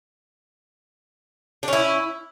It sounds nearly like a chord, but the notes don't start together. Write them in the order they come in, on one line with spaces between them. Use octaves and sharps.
D4 C#4 E4